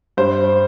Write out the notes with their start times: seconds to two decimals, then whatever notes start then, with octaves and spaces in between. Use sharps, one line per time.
0.17 G2 C5